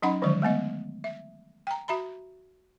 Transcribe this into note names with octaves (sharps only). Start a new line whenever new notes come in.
F#3 C#4 D#4 D#5 F#5 B5
D3 D#3 F3 F#3 G#3 C5
G#3 A3 B3 D#5
E5
G5 A#5
F#4 E5 A#5 B5